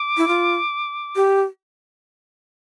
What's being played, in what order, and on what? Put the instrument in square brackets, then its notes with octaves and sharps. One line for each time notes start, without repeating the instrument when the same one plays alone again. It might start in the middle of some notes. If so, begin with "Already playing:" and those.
Already playing: [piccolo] D6
[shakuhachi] E4
F4
G4